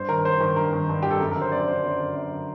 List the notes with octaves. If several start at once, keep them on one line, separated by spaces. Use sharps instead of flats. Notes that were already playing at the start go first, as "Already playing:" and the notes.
Already playing: G2 C5
D#3 A#4
G2 C5
D#3
G2 A#4
D#3
G2
D#3 G4
A4
F#2 A#4
A#4
D3
C5
F#2 D5
D3 C5
F#2 C5
D3
F#2
D3